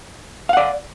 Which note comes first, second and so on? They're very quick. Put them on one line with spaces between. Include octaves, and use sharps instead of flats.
F5 F#5 D5